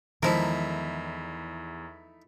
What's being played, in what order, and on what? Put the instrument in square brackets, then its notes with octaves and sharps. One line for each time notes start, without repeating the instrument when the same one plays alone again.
[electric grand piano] E2 [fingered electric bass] D#3 G#3 [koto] F3 A#4 [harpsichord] A3 D#4 E4